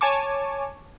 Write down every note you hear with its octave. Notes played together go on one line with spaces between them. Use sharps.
C#5 G#5 A5 C#6 D6